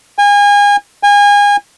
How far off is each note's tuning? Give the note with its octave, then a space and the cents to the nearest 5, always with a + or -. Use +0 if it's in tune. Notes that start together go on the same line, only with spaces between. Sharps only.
G#5 -30
G#5 -30